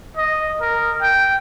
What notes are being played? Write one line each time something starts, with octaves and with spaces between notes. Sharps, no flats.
D#5
A#4
G5